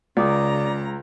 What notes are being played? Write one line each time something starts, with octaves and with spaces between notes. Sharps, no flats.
C#2 C#3 D5 A#5 D6 D#6